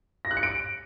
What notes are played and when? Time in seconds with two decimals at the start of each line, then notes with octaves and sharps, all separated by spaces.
0.25 A#6
0.31 F#6
0.37 C#7
0.43 D7